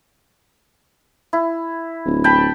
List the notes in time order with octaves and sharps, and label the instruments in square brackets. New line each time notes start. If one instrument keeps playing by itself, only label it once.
[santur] E4
[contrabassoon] D1
[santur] G5 A5 B5